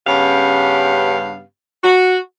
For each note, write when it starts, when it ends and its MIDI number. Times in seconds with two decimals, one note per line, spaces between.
0.07 1.41 43
0.07 1.41 49
0.07 1.41 59
0.07 1.41 61
0.07 1.41 67
0.07 1.41 77
1.83 2.18 66